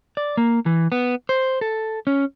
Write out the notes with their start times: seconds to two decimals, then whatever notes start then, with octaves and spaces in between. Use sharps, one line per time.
0.17 D5
0.37 A#3
0.66 E3
0.92 B3
1.29 C5
1.61 A4
2.07 C#4